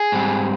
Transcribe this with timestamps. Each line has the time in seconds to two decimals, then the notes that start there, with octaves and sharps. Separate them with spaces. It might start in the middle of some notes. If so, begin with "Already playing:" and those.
Already playing: G#4
0.12 G#2 G3 C4